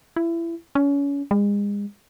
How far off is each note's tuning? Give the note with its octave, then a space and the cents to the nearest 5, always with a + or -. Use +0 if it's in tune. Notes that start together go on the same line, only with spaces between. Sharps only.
E4 +25
C#4 +30
G#3 -35